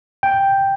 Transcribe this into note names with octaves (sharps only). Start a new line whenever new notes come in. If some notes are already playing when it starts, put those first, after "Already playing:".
G5